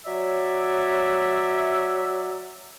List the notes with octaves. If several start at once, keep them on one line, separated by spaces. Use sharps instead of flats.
F#3 C#5 D5 E5